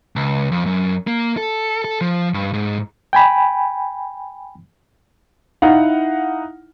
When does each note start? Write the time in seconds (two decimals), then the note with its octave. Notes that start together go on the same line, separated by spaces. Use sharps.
0.16 C#2
0.52 F2
0.66 F#2
1.07 A#3
1.37 A4
1.85 A4
2.01 F3
2.34 G2
2.53 G#2
3.13 G5 G#5 B5
5.62 D#4 E4 F5 F#5